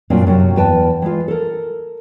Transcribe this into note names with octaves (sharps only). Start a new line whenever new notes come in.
F#2 A#2 F#3 C4 D4
F#2 C3 F#3
E2 B3 B4 G5 A5
E3 G#3 F4
A4 A#4